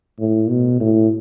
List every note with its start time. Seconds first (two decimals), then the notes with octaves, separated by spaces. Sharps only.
0.19 A2
0.49 B2
0.81 A2